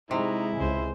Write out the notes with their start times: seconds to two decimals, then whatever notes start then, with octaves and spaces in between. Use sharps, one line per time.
0.11 C3 G#3 D#4 E4
0.56 C#2 C#3 G#3 C5